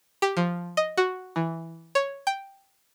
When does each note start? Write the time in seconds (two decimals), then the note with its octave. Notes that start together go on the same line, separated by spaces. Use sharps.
0.22 G4
0.37 F3
0.77 D#5
0.98 F#4
1.36 E3
1.95 C#5
2.27 G5